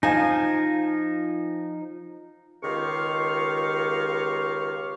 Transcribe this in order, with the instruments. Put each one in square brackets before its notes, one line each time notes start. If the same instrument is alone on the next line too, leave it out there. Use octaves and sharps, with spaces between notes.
[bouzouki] F3 G#5 [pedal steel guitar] D#4
[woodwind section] C#2 D#3 F4 G4 F5 C#6